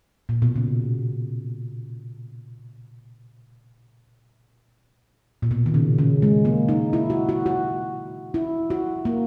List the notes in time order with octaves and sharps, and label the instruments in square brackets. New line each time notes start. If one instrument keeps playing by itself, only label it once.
[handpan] A#2
B2
C#3
A#2
B2
D#3
C#3
C#3
G#3
A#3
D#4
E4
F#4
F#4
F#4
E4
F#4
A#3